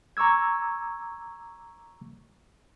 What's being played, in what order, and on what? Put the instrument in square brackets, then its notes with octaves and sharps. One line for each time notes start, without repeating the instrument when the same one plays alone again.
[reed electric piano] A#5 C#6 D6 E6 G#6